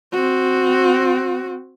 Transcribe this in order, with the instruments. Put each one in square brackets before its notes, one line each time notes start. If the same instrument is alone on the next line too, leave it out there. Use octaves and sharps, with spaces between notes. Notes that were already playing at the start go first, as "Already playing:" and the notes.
[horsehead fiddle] C4 F#4